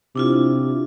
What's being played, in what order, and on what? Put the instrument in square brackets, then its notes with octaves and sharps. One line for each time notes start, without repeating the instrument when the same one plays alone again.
[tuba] C3 [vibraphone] D4 E4 F4